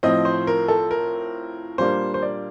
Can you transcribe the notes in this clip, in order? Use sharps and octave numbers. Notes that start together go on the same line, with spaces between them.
A2 F3 C4 D#5
C5
A#4
A4
A#4
A#2 G3 A#3 D4 C5
C5
D5